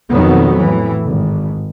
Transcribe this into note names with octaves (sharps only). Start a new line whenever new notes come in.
F2 B2 D#3 F#3 B3
A2 E3
G#1